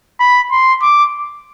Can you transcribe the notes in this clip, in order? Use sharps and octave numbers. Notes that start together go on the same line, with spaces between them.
B5
C6
D6